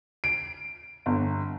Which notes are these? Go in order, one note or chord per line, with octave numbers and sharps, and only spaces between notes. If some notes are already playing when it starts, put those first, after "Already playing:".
D7
G1